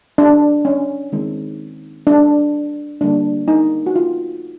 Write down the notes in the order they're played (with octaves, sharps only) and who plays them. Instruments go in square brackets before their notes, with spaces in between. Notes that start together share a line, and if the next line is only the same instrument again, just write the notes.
[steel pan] D4
C#4
D#3 G#3 C4
D4
D3 G3 A#3 D4
D#4
F#4
F4